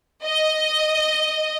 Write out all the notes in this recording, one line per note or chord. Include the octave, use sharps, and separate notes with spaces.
D#5